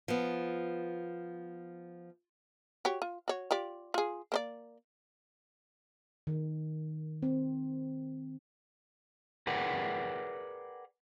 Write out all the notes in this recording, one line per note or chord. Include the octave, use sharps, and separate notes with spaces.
F3 B3
F#4 G4 C#5
F4
F#4 C#5
F4 G4 D5
F4 G#4
A#3 C5 D5
D#3
C4
G#4 A#4 B4 D5 F#5 G5